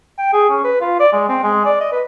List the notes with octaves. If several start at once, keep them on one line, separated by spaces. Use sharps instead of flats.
G5
G#4
C#4
B4
F4
D5
G#3
C4
G#3
D5
D#5
B4